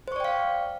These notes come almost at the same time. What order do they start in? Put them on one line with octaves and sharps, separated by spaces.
C5 C#6 D5 G5 F5